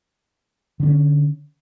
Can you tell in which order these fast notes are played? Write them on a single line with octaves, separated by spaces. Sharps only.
D3 D4 C#4